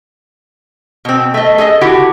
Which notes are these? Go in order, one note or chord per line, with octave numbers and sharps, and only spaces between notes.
B2 C4
A3 D#5
G#4 A4 D5 D#5
D3 E4 F#4 G4